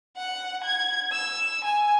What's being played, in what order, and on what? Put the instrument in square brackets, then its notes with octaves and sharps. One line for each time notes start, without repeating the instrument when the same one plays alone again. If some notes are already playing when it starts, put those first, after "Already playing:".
[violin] F#5
G#6
E6
G#5